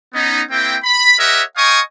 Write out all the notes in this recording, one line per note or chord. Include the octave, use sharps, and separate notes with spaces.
B3 C#4 D#4
A#3 C4 E4 G5
B5
G4 A#4 C#5 D#5 E5 F#5
D#5 F5 G5 G#5 C#6 D#6